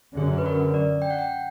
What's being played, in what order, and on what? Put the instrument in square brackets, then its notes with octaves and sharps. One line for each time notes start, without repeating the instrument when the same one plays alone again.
[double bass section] F#2 D3 F#3 [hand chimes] G#4
[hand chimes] B4
A#4
D5
G5
F#5
G5